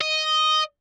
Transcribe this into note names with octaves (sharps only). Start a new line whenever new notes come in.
D#5